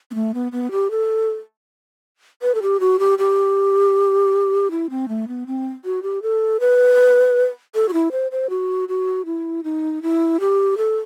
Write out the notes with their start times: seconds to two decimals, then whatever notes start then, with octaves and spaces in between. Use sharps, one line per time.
0.11 B3
0.14 A3
0.34 B3
0.52 B3
0.71 G4
0.91 A4
2.42 B4
2.55 A4
2.62 G4
2.80 F#4
2.99 G4
3.18 G4
4.71 E4
4.90 C4
5.08 A3
5.28 B3
5.47 C4
5.85 F#4
6.03 G4
6.22 A4
6.60 B4
7.75 A4
7.89 F#4
7.93 E4
8.12 C5
8.31 C5
8.50 F#4
8.89 F#4
9.25 E4
9.64 D#4
10.02 E4
10.40 G4
10.77 A4